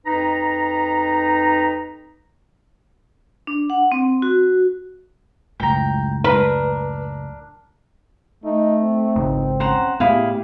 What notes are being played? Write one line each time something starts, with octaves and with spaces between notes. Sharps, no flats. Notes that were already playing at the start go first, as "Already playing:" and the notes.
F2 D#4 B4 A#5
D4
F#5
C4
F#4
C#2 F#2 A2 G5 A#5
D4 A#4 B4
A3 D#4
C4
G#1 C#2 D#4
C#4 C5 F#5 A#5
A2 B3 E4 G4 G#4 F5